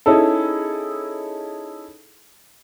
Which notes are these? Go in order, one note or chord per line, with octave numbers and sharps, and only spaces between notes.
C#4 D#4 E4 G#4 A4